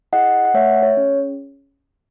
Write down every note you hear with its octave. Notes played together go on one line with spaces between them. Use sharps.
E4 G#4 D#5 F#5
F#5
A3 C#5 E5
C#5
C#4 G#4